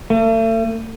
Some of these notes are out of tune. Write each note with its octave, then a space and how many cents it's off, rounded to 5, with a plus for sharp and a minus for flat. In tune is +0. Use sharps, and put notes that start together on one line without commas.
A3 +40